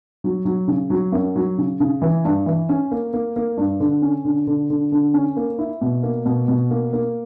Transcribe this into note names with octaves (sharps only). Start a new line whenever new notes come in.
F#3
F#3
C#3
F#3
F#2
F#3
C#3
C#3
E3
G2
E3
C#4
A#3
A#3
A#3
G2
D3
C#4
D3
D3
D3
D3
C#4
A#3
E4
B2
A#3
B2
B2
A#3
A#3